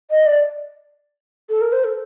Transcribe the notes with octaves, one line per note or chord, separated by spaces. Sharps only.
D#5
D5
A4
A#4
C5
A4